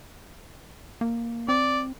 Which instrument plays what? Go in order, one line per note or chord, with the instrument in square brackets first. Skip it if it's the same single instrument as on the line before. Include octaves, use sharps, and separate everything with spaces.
[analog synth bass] A#3
[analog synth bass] C4 [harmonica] D5